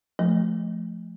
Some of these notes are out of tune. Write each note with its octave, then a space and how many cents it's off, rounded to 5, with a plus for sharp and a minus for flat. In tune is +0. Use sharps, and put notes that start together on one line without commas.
F3 +0 A3 -10